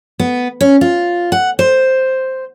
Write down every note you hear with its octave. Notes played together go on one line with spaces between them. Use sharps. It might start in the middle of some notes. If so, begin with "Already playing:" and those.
B3
C#4
F4
F#5
C5